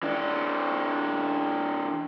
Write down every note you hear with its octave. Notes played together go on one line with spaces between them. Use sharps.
E3 D4